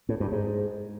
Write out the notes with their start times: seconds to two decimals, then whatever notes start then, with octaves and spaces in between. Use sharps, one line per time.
0.09 A2
0.20 G2
0.32 G#2